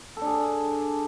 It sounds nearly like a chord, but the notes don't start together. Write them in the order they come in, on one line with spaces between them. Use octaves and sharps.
A4 D4 G#4